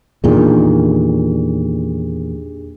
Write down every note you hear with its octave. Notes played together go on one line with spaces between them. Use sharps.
E2 A#2 D#3 D4 G4 G#4